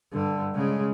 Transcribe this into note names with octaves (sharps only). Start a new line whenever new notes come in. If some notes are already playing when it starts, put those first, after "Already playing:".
G2 D3
C#3 G#3